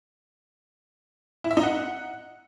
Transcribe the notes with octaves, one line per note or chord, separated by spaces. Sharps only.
E4
E5
D#4
F#5